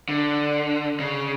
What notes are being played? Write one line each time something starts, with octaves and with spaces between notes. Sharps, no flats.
D3
C#3